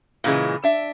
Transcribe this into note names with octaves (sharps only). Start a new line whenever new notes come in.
A#2 C#3 E3 G#3
D4 E5